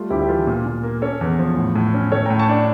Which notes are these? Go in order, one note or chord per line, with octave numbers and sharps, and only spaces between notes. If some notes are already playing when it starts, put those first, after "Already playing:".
Already playing: G3 A3 F4
D2 E4 G4
G4
E3 F4 A4
A#2
A#2
A#3
C#4 A4 C#5
E2
F3
A2
A2
C#4
A2 A4 C#5
A2 G5 A#5
A5 C#6
D4